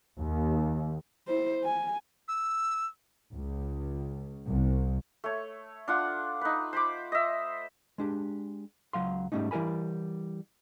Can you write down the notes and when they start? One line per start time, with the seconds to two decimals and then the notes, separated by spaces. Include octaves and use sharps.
0.17 D#2
1.28 E4 C5
1.64 G#5
2.28 E6
3.35 C#2
4.48 C2
5.24 A3 C#5
5.88 D4 F4 F#5
6.41 D#4 B4
6.73 C5 B5 D6
7.12 D#5 E5
7.98 G#3 D4 G4
8.93 C#2 F#3 F5 C6
9.32 G#2 G3 A3 C#4 D#4
9.51 E3 G3 E4 A#4 G#5 B5